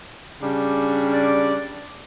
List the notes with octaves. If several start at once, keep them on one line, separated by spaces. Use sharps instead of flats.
C#3 G3 D4
D5